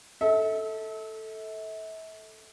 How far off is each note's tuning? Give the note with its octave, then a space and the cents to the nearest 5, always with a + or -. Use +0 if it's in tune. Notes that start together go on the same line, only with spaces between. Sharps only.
A4 +0 E5 -40